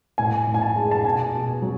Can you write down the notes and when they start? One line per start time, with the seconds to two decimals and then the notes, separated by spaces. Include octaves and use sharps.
0.18 A2 G#5
0.47 A2
0.54 G#5
0.62 A5
0.76 G#3
0.91 A5
1.04 B2 G#5
1.34 B2
1.62 F#3